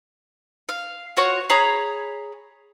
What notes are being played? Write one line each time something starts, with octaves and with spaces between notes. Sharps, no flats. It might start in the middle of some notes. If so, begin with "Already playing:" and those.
F5
F4 F#4 C#5 C#6
G#4 C#5 A#5 B5